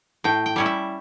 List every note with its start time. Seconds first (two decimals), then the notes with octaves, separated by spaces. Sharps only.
0.24 A2 G5
0.46 G5
0.56 G3 C#4 E4
0.66 E5